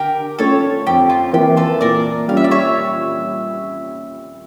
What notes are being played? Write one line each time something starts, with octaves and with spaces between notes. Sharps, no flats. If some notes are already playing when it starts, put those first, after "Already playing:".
Already playing: D3 G4 A#4
A3 C#4 F4 A4 C#5
F2 G4
F4
E3 A#3 G4
F4 A4
A#2 A#4 D5
G3 C#4 F4 F5
E5
D5
C#5 E5